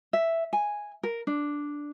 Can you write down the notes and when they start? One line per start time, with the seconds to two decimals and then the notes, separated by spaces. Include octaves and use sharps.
0.13 E5
0.53 G#5
1.03 A#4
1.27 D4